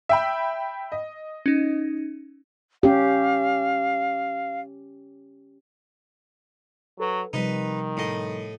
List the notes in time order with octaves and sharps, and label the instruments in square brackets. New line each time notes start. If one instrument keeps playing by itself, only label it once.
[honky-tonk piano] E5 G5 B5
D#5
[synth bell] C#4 D#4
[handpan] C#4 G4 [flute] F5
[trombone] F#3 [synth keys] A4 B4
[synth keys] C3 F3 G3 [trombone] D#3 [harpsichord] D#4 B4
[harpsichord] A2 D#5